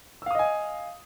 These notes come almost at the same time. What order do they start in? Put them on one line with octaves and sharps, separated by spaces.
E6 F5 D#6 D#5 G#5